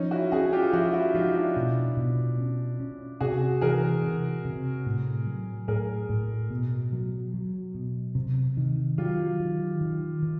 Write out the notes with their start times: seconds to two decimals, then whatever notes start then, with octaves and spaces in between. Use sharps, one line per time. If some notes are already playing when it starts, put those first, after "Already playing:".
Already playing: F3 C#4 D#4
0.11 E4 F#4
0.32 C#4 F#4 G#4
0.53 F4 G4
0.73 F3 E4 F#4
0.94 E4 F#4
1.14 F3 D#4 F4
1.35 D4 E4
1.56 B2
1.97 B2
2.38 C#4
2.80 C#4
3.20 C3 F#4 G#4
3.61 E3 G#4 A#4
4.03 C3
4.45 C3
4.86 A2
5.27 F#3
5.68 A2 G#4 A#4
6.09 A2
6.50 B2
6.93 F#3
7.34 F#3
7.74 B2
8.15 C3
8.57 D#3
8.98 F#3 F4 G4
9.40 D#3
9.81 D#3
10.22 D#3